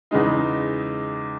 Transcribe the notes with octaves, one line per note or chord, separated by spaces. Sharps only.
E2 C#3 G#3 D#4